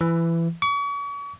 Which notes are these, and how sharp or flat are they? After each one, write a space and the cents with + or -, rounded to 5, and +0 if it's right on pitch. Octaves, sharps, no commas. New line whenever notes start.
E3 +20
C#6 +40